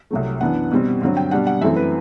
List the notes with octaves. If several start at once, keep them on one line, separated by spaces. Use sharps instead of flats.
C2 C3 F#3 A3
F#2 E3 B3 D4 F#5
B2 G3 C4
G2 D3 F#3 C4
G5
B2 G3 D4 F#5
F#5
F#2 E3 A3 C4 E5
B4